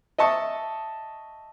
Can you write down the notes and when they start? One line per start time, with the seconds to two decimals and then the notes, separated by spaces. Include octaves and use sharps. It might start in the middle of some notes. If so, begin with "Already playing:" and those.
0.18 D#5 E5 A5 C#6 D#6